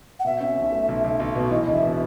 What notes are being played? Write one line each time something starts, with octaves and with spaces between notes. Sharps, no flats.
F#5
B2 E5
C#4
B1
A3
B1
B1
B1
B2
E2 D#5
E1
E5
B2